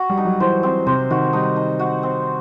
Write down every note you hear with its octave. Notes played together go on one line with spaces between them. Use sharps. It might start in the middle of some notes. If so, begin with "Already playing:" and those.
Already playing: F#4
G3
D#4
F#3
E3 C5
C4
C3 C5
D#3 F#4
G3 D#4
D#4
F#4
C4